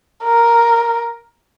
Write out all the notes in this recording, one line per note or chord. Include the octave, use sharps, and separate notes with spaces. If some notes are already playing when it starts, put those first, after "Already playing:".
A#4